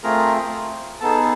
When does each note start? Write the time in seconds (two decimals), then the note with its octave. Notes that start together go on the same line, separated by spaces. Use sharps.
0.03 A3 C4 F4 G#4 A#4 A#5
1.01 B3 D#4 G#4 A4 A5